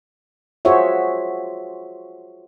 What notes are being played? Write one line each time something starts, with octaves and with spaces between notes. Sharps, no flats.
F4 F#4 G#4 C5 C#5 E5